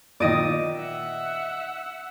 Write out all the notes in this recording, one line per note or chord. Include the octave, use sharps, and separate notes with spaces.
A#2 D#3 D5 D#5
E5 F#5